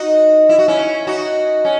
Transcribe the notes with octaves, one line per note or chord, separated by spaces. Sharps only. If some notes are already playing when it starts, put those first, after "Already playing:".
Already playing: D#4 F#4
E4
F#4
C#4 E4
D#4 F#4
C#4